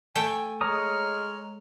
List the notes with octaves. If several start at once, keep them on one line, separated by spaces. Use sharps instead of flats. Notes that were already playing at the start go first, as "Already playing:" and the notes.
A3 G5 G#5
G#3 C#5 A#5 D#6 F6